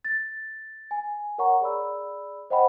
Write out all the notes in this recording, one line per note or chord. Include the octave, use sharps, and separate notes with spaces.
A6
G#5
A#4 C#5 F#5 A#5 C#6
G#4 D5 B5 E6
C5 D#5 F#5 G5 B5